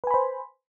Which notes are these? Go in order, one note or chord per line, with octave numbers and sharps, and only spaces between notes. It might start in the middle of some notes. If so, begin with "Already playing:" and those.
B4 C5 G#5 B5